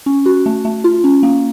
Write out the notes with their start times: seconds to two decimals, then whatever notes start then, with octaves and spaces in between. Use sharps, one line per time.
0.06 C#4
0.26 F#4
0.46 A3
0.65 A3
0.84 F4
1.04 C#4
1.23 A#3